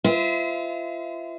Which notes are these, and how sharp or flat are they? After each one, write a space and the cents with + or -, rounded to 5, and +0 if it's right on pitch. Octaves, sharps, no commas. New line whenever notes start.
F4 -30 C5 -40 E5 -35